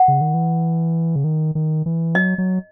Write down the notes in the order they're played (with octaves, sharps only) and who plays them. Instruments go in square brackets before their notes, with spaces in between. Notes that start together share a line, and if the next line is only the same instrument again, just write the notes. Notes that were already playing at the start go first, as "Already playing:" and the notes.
Already playing: [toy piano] F#5
[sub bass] C#3
D#3
E3
C#3
D#3
D#3
E3
[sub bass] F#3 [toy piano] D#5
[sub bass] F#3